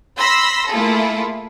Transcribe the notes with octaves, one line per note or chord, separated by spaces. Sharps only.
B5 C6 E6 A#6 B6
A3 A#3 E4 F4 G#4 A4